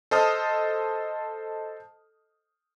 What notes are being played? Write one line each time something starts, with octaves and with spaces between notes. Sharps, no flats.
A4 C5 D#5 A5 D#6 F6